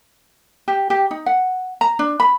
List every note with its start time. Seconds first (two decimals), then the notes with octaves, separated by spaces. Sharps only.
0.68 G4
0.90 G4
1.11 D#4
1.26 F#5
1.81 A#5
1.99 D4
2.20 B5